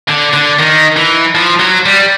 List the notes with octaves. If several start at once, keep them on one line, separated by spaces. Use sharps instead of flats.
D3
D3
D#3
E3
F3
F#3
G3